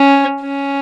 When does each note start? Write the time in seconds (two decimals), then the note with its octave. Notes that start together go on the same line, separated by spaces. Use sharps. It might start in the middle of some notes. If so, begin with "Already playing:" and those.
Already playing: C#4
0.41 C#4